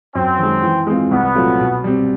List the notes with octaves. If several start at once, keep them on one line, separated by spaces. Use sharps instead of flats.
F#2 C4
D#3 G#3
E3
G#3 C4 F4
C2 B3
A#2 F#3 A3 C4
B2
G3 C4